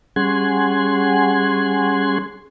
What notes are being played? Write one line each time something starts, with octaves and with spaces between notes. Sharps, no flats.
G3 C#4 G#4 F#5 G#5 C6